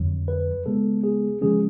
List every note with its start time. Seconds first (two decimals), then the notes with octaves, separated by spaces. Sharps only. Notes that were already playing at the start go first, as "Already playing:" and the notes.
Already playing: F2 D3 F#3
0.28 B4
0.66 C#3 G#3 B3 A4
1.04 G#4
1.41 C#3 F3 G#3 C#4 G#4